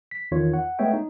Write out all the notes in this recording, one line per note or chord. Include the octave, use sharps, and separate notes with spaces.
B6
E2 D#3 F4 C#5
F#5
G#3 A3 B3 C#5 E5 G5
D#4